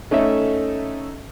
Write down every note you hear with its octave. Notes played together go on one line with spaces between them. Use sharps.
A3 C#4 D#4 A4 E5